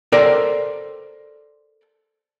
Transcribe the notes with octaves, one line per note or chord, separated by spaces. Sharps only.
A4 A#4 C5 D5 G5